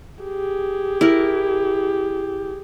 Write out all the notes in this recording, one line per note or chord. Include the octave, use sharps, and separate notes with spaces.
G4 G#4
E4 A#4